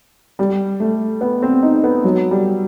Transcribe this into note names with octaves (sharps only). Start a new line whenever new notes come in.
G3
A3
B3
C4
D#4
B3
F#3
G3